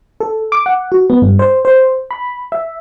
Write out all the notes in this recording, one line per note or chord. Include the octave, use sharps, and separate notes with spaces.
A4
D6
F#5
F#4
B3
G2
C5
C5
B5
E5